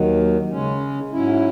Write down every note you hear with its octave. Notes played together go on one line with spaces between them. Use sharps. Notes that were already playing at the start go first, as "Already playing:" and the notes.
Already playing: D#2 D#3 F#3
C#3 G#3 C#4
G#2 F#3 C#4 E4